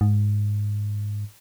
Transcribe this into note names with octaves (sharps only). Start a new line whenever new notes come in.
G#2